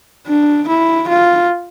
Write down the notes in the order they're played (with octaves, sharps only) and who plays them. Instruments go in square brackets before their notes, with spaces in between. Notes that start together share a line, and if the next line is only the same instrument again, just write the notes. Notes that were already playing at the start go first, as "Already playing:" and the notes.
[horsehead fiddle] D4
E4
F4